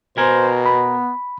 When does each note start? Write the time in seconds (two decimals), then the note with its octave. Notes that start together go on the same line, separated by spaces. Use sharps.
0.18 B2 A#4 C5 G#5
0.66 B3 B5